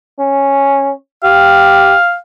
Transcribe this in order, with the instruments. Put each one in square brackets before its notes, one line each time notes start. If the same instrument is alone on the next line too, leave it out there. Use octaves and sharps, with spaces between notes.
[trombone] C#4
[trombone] G4 [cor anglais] F5